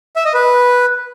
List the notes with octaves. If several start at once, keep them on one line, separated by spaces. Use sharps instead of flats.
E5
D#5
B4